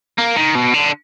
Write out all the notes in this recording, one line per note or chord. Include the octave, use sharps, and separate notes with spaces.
A#3
D#3
B2
D3